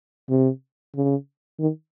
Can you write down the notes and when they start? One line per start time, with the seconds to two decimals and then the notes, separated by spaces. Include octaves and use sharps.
0.29 C3
0.95 C#3
1.60 D#3